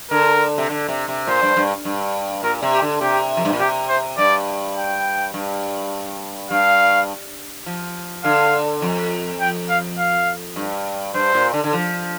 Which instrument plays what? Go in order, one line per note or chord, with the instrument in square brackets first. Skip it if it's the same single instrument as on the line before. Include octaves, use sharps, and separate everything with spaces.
[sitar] D3 [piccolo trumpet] A#4
[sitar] C3
D3
C3
C3
[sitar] A#2 [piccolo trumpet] C5
[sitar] G2
G2
G2
[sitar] A#2 [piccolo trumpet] A#4
[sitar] C3
[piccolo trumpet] G4
[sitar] D3
[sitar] C3 [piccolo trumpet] G4
[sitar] F2
G2
A#2
[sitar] C3 [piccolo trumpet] G4
[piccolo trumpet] C5
[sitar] G2 [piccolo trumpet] D5
[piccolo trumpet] G5
[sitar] G2
[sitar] G2 [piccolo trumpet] F5
[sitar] F3
[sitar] D3 [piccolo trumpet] F5
[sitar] F2
[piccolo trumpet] G5
F5
F5
[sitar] G2
[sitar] G2 [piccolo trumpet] C5
[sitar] A#2
D3
D3
F3